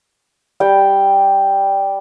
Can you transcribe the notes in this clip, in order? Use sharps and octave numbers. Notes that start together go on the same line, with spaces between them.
G3 G5